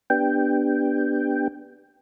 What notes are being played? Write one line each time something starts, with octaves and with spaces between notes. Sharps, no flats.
B3 D4 G4 G5